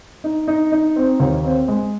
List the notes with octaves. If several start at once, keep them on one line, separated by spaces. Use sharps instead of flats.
D#4
D#4
D#4
C4
D#2
C4
G#3